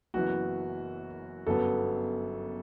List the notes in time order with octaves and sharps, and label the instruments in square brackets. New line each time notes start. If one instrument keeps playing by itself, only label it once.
[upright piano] F#1 F#2 E3 B3 [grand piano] F#4
[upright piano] G1 F#2 F#3 B3 [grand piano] A4